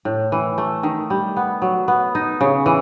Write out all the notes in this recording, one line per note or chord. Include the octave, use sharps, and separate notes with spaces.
A2
E3
A3
D#3
G3
B3
F#3
B3
D#4
C#3
E3